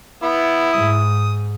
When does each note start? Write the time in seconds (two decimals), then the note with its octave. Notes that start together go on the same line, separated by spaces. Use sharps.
0.23 B3 E4
0.73 G#2 D#6